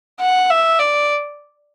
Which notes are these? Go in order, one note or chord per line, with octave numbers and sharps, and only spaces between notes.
F#5
E5
D5